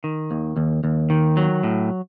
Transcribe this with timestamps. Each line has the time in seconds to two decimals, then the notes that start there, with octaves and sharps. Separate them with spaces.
0.04 D#3
0.31 D#2
0.57 D#2
0.84 D#2
1.10 D#3
1.37 F#3
1.63 A2